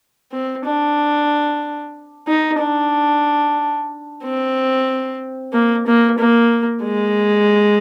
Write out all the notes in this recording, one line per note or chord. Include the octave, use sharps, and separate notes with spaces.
C4
D4
D#4
D4
C4
A#3
A#3
A#3
G#3